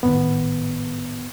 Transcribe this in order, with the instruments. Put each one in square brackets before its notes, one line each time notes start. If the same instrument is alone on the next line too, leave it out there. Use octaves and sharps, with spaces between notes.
[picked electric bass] G#1 A2 D#3 [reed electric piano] B3